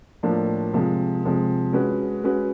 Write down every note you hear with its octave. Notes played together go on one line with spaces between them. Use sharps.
A2 F3 A#3 D4
C3 F3 G#3
C3 F3 G#3
G#3 C#4 F#4 B4
G#3 C#4 F#4 B4